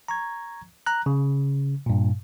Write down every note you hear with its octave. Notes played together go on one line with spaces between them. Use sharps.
A#5 C#6 G#6
A#5 F#6
C#3
G2 A#2